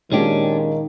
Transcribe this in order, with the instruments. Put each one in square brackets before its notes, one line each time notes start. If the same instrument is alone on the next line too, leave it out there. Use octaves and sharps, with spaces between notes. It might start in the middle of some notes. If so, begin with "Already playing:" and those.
[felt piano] A#2 G#3 [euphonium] D#3 [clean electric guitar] C#4 D4 G4